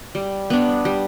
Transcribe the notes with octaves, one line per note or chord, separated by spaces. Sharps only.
G3
B3 D4
G3